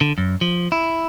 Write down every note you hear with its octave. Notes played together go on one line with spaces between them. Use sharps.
D3
F#2
F3
E4